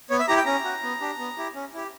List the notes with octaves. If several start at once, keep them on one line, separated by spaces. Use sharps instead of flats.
B3 C#5
E5
E4 G4 A#5
G5
C#4 A#5
F#4
B3
D4 G4
B3
E4 G4
C#4
E4 G4